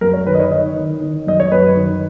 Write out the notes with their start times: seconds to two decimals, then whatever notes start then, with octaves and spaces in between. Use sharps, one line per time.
0.01 F#2 A#4
0.13 C#5
0.26 D#3 B4
0.35 D#5
0.40 C#5
0.51 D#3 D#5
0.76 D#3
1.01 D#3
1.27 F#2 D#5
1.40 C#5
1.52 F#2 B4
1.76 D#3